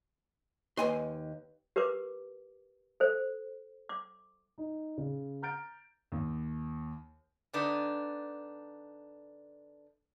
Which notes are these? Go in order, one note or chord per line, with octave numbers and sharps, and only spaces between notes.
D#2 B4 D#5 G#5 C6
G4 A#4 B4 D6
A4 C5
D6
D#4
C#3
A#5 F6 G6 A6 D7
D#2
D3 B3 D4 D#4